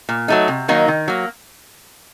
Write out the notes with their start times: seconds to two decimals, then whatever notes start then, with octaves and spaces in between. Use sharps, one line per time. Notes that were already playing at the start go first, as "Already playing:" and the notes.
0.09 A#2
0.28 F#3 A3 D#4
0.48 C3
0.68 D#3 F#3 A#3 D#4
0.88 D#3
1.08 F#3 A#3